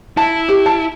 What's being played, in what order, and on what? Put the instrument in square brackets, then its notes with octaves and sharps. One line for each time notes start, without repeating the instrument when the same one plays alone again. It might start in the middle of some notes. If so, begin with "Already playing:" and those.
[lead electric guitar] E4 [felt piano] A5
[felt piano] G4
A5